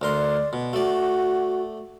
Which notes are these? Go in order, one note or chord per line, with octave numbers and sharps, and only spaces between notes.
D2 A#4 D5 C6
B2
A3 F#4 D5